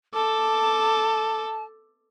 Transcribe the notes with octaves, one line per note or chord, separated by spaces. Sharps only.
A4 A5 D6